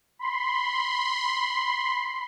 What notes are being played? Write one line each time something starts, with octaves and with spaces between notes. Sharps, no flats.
B5 C6